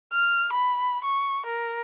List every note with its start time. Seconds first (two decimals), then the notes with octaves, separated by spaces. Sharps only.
0.13 F6
0.53 B5
1.04 C#6
1.46 A#4